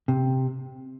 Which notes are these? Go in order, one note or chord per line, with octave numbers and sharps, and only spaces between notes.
C3